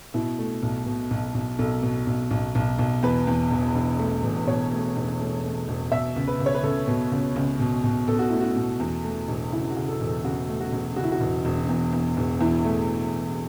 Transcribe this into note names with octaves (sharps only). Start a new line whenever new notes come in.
B2 E4
A3
B1
B2
B1
B1
B1 A4
B2
B1
B1
B1
B1
E2 B4
E2
E1
E1
A3
E1
B2 C#5
A3
E1
A3
A3
E1
B2 E5
C#2
B4
C#2
C#5
B4
C#2 A4
B2
C#2
C#2
B2
B2
B2 A4
F#4
A3 E4
F#4
B2
E2
A3
E1
C#3 E4
F#4
C#3
A4
E1
A4
C#3 F#4
A3
F#4
E1
C#3 F#4
E4
F#4
E1
E1
E2
E2
E1
E2 E4
A3